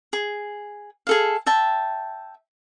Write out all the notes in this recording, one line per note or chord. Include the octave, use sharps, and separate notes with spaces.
G#4
G#4 A4 F5
E5 G5 A5